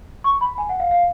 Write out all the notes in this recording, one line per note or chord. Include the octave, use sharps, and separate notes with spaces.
C#6
B5
G#5
F#5
F5
F5